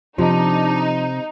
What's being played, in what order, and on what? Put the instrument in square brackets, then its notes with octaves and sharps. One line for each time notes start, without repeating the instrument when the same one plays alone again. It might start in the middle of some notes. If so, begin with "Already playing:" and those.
[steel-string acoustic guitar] C3 [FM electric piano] F3 [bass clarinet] D4 [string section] D#4